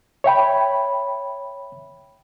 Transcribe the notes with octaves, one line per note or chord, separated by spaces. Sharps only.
C#5 E5 G5 B5